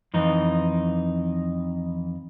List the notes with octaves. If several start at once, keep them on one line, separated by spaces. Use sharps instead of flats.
F2 E3 D#4